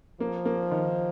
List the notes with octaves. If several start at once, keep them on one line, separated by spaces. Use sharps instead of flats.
F3 A#3
A#3
D#3